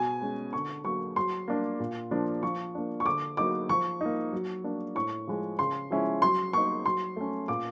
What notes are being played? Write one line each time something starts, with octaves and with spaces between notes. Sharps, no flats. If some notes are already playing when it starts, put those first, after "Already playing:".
Already playing: B2 G#5
G#3 C#4
D3 C#6
F#3 A#3 C#6
F#3 C6
A#3 D4
A#2
F3 A#3 D4
F3 C#6
A#3 D4
C#6
D3 D6
F#3 A#3 D#4 D6
F3 C#6
A#3 D#4
F#3
A#3 D4
A2 C#6
F3 G#3
C#3 C6
F3 G#3 C#4 E4
F#3 C6
A#3 D#4 C#6
F#3 C6
A3 C#4
A#2 D6